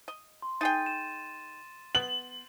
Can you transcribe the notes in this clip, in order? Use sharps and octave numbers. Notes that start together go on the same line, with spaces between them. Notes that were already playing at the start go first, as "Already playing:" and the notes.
D#5
C6
D#4 G#4 G5 A6 D#7
E7
B3 F#7